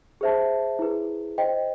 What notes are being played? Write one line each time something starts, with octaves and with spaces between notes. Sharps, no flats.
G#4 C5 E5 A5
E4 G#4 B4
C5 D#5 G5